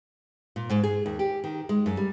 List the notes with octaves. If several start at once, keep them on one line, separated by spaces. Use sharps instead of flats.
A#2
G#2
G#4
D#2
G4
D#3
G#3
F#2
G3